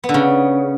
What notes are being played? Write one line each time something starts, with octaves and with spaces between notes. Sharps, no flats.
B3
D3
C#3